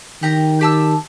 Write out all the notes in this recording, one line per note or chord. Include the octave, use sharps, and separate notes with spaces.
D#3 G4 A#5
G4 A5 E6